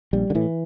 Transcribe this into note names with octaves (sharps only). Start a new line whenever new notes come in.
A#1 G3
D3
A2 E3